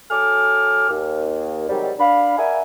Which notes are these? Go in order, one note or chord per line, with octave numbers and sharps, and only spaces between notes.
F#3 A4 G#5 D6 F6
D#2
G#2 C3 D#3 F#3 G3
D4 F5 B5
A#4 D5 E5 F#5 G#5